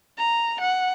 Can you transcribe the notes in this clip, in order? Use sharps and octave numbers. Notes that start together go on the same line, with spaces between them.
A#5
F#5